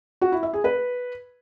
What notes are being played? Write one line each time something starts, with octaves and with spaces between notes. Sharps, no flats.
F#4
E4
E5
G#4
B4